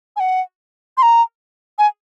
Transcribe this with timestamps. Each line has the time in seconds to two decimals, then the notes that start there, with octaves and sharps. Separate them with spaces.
0.16 G#5
0.20 F#5
0.97 C6
1.02 A#5
1.78 G#5